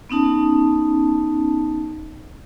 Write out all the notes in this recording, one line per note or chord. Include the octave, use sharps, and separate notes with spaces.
B3 C#4 D#4 A5